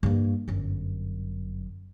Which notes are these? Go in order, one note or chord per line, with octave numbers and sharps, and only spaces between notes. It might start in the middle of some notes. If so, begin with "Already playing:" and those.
G2 A#3
G1 F#2